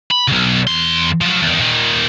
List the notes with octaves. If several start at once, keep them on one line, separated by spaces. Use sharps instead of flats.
B5
B1 C#3
E2 C6
F3 F#3
E2 D#3
A#2 D#3